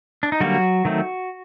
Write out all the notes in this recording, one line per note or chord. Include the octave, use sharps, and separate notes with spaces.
D4
D#4
D3 F#3 G3 A#3 F#4
D#3 F#3 A3 C4